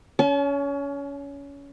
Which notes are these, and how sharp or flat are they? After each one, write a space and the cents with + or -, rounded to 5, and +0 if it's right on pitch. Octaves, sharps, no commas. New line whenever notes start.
C#4 +25 A5 -45